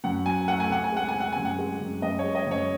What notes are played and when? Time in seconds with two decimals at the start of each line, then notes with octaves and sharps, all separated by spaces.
0.04 F#2 F#5
0.26 F#3 G#5
0.48 A3 F#5
0.60 G#5
0.70 C3 F#5
0.84 G#5
0.92 G#3 F#5
1.08 G#5
1.14 C3
1.20 F#5
1.33 F#2 G#5
1.45 F#5
1.58 G#3
1.80 F#2
2.02 F#2 D#5
2.19 C#5
2.24 G#3
2.35 D#5
2.47 F#2 C#5